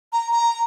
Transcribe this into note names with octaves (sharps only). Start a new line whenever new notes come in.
A#5
A#5